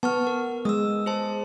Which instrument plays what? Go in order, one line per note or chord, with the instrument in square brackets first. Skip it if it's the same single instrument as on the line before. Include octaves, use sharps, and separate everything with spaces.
[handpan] B3 [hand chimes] A5 C#6 F6
[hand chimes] A#4
[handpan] G#3 [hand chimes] D#6 E6
[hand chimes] G#4 C5 A5